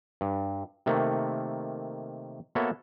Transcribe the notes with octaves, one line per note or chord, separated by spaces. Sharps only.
G2
C3 D#3 A3 A#3
A#3 B3 F#4 A4 C#5 E5